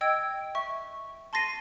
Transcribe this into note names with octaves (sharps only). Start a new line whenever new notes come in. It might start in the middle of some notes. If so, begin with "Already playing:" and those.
D#5 G5 E6 G#6 D7
E5 C#6
A5 C6 A6 A#6 C7 D#7